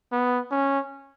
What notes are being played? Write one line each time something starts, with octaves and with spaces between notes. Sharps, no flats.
B3
C#4